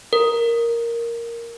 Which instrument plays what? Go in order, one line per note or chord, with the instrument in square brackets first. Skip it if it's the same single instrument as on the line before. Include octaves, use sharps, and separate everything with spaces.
[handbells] A#4